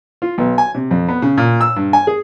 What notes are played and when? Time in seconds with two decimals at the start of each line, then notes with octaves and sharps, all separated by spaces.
0.22 F4
0.38 B1
0.58 G#5
0.75 C3
0.91 F2
1.09 B3
1.22 C#3
1.38 A#2
1.61 E6
1.76 G2
1.93 G#5
2.07 G#4